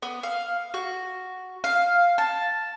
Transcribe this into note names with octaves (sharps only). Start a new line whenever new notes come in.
B3
F5
F#4
F5
A5